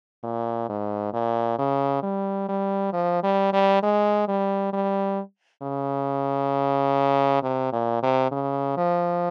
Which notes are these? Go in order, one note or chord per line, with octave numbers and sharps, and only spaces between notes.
A#2
G#2
A#2
C#3
G3
G3
F3
G3
G3
G#3
G3
G3
C#3
C3
A#2
C3
C#3
F3